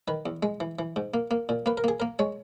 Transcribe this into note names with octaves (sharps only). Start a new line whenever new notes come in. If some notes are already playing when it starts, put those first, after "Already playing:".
D#3 B4
E2
G#3
E3
E3
G#2
A#3
A#3
A#2
A#3 B4
A#4
A#3 G#4
A#3 A#4
G#3 C#5